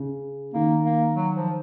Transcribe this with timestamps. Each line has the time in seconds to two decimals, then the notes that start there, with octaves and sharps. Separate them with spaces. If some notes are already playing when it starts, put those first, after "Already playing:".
Already playing: C#3
0.54 D#3 A#3
0.85 A#3
1.15 F#3
1.36 F3